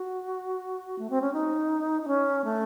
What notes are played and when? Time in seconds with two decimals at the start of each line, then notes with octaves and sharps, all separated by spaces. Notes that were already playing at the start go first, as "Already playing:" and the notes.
Already playing: F#4
0.99 A3
1.10 C4
1.21 C#4
1.33 D#4
2.02 D#4
2.08 C#4
2.44 A3